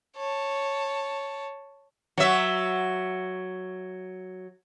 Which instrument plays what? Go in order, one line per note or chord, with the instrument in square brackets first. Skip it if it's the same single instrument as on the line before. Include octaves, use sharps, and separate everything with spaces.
[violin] C#5 A5
[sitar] F#3 E5